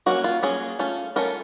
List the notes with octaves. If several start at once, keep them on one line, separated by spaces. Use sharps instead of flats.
F#3 A#3 C#4 F#4
F4
F#3 A#3 C#4 G#4
A3 C#4 F4
A3 C#4 F4 A#4